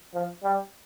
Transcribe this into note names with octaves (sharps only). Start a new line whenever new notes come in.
F3
G3